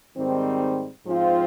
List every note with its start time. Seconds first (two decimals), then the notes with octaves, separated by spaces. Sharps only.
0.17 G#2 D#3 G3 C4
1.06 G#2 F3 C4 F4